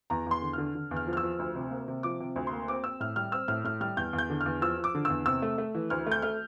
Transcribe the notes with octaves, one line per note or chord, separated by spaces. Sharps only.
E2 A#5
E2 C6
D3
D3 F6
D3
E2
F6
F3
F6
E6
F3
D2
C3
A#3
C3
F3 D6
C3
D2
C6
A#3
C4 D6
C4 E6
A2 F6
G3 F6
C4 E6
A2 F6
A2 F6
G3 F6
E2 G6
E2
G6
D3
E2 F6
F3 E6
F3
D6
D3
E2 E6
C3 E6
A3
A3
E3
D2 F6
A3
G6
A3 F6